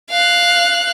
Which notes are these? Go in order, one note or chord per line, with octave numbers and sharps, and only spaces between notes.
F5 F#6